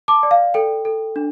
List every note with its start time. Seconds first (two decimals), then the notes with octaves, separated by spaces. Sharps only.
0.08 A5 D6
0.23 D5
0.31 F5
0.54 A4 G5
0.85 A4
1.16 D4